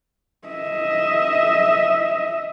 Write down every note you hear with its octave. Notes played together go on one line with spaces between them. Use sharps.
D#5 E5